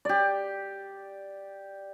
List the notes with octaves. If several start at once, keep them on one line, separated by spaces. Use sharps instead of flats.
G4 D5